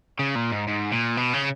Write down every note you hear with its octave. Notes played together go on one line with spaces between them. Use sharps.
C#3
A#2
G#2
G#2
A#2
B2
C#3